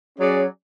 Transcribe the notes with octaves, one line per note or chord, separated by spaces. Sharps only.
F#3 C#4 G#4 D5